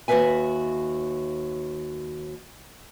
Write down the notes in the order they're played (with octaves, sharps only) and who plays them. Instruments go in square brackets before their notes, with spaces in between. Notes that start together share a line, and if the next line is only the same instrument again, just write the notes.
[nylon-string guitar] D#2 F#4 A4 B4 E5 G#5